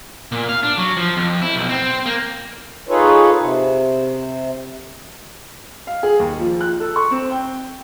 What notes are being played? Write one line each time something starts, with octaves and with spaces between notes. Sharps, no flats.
A#2
F5
D4
F#3
F3
F2
E4
B1
C4
A#3
D#4 F4 G#4 A4 B4 C#5
C3
F5
G#4
D#2
F3
F#6
A4
C#6
C4
G5